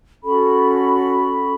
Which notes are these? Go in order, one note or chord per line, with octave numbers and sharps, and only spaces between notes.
C#4 F#4 A4 B5